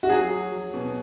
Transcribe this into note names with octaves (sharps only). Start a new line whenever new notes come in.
F#4
F#3 G#4
F#3
F#3
B2